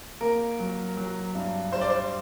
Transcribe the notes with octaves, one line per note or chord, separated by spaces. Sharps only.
A#3 A#4
F#3
F#3
G2
G3 C5
D5
C5